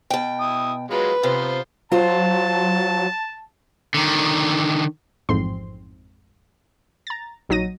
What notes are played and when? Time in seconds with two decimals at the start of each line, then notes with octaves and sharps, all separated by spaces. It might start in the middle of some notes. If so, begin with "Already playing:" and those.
0.10 B2 G5
0.40 E4 D#6
0.91 F#3 G#3 F4 B4
1.23 C3 B3 F4 C5
1.92 F#3 F4 C5 A5
3.94 D3 D#3
5.29 A1 F2 G#2 C4 C6
7.07 A#5 A6
7.49 A#1 F#3 D#4 A#6 D#7